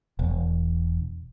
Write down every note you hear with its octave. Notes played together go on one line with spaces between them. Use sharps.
E1